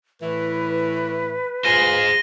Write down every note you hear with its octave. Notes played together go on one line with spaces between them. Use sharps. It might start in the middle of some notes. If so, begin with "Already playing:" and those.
A2 E3 B4
D2 F4 G#4 C5 A#6 D#7 G7